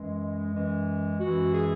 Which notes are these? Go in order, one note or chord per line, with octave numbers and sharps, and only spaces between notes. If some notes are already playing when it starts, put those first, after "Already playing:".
Already playing: F#2 E3 G#3
F#2 E3 G#3
F#2 E3 G#3 F#4
G#4